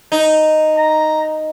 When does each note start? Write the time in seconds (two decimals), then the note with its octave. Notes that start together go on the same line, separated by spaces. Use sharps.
0.12 D#4
0.78 A#5